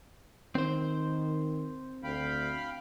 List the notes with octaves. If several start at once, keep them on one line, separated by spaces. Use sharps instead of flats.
D#3 C4 C5
D2 F5 G5 B5